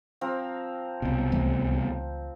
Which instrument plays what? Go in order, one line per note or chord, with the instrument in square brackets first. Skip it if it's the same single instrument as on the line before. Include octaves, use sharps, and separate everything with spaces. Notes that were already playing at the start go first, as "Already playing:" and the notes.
[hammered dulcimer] F3 C4 A#4
[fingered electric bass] C2 B2
[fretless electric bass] C#2 E3 A3